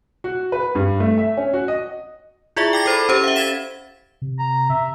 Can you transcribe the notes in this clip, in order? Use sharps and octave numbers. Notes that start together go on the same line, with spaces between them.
F#4
B4
G2
A3
E5
C#4
F#4
D#5
E4 F4 G#4 D5 E5 C#6
G5 D6 A6 A#6
A4 C5 B5 A6
C#4 G4 C5
E5 F5
G#6 A6 B6 E7
C3
A#5
C3 E5